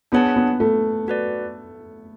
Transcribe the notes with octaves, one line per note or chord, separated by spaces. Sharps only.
B3 D4 G#4 C#5 F#5 A5
B3
A3
F#4 B4 D5